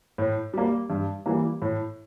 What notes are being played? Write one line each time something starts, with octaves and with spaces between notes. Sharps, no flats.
A2
G3 A#3
G2
E3 G3 A#3
A2